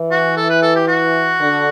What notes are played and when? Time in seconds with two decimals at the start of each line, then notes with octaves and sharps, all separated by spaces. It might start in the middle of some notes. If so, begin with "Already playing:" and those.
Already playing: E3
0.11 F#4
0.37 A4
0.49 B4
0.62 A4
0.75 G4
0.87 F#4
1.39 D3